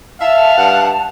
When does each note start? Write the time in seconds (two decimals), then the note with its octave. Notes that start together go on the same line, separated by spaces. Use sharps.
0.21 E5 F5 A5
0.57 G2 F#5